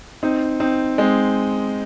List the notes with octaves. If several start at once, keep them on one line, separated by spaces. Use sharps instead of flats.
C4 D#4
C4 D#4
G#3 C4